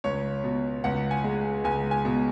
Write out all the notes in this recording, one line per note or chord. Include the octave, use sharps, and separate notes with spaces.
C#2 C#5
B2
C#2 F#5
G#5
G#3
C#2 G#5
G#5
B2